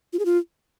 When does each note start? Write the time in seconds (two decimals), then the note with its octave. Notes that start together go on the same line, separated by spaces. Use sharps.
0.13 F4
0.19 G#4
0.25 F4